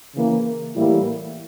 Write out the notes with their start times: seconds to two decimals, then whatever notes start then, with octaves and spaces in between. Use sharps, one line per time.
0.15 C#3 E3 A#3
0.76 A2 E3 G3 A#3 E4